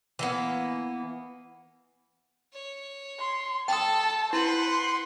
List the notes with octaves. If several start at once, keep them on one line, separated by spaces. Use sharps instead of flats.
E3 A#3 B3
C#5
C6
A4 G5 A5 D#6
E4 B4 C5 F#5
C6